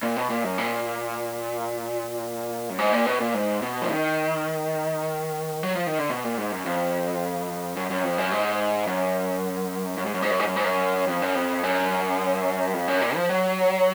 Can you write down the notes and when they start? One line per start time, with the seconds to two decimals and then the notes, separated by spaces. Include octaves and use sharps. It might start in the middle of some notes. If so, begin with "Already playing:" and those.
0.03 A#2
0.16 B2
0.30 A#2
0.44 F#2
0.58 A#2
2.70 F#2
2.79 G#2
2.93 A#2
3.06 B2
3.20 A#2
3.34 G#2
3.62 B2
3.82 F3
3.89 D#3
5.63 F#3
5.75 F3
5.87 D#3
5.99 D3
6.10 B2
6.24 A#2
6.38 G#2
6.52 F#2
6.66 F2
7.76 F#2
7.90 F#2
8.04 F2
8.18 F#2
8.32 G#2
8.87 F#2
9.98 F#2
10.06 G#2
10.14 F#2
10.22 G#2
10.30 F#2
10.40 G#2
10.47 F#2
10.56 G#2
10.64 F#2
11.07 F2
11.22 F#2
11.35 F2
11.63 F#2
12.74 F2
12.88 F#2
13.01 A#2
13.16 F3
13.29 F#3